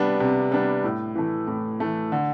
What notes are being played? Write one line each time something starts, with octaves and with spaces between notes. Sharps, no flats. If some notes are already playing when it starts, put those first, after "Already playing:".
Already playing: C3 G3 B3 D4
C3
G3 B3 D4
A2
E3 A3
A2
E3 A3
D3